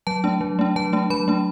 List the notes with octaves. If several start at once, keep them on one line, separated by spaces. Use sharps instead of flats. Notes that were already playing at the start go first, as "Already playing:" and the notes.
F#3 A5
A3 D4
F#3
A3 D4
F#3 A5
A3 D4
F#3 B5
A3 D4